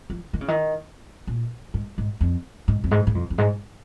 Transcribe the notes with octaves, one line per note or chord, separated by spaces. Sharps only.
F3
D#3
C#3
D#3
A#2
G#2
G#2
F2
G#2
F2
G#2
G#2
F2
F2
G#2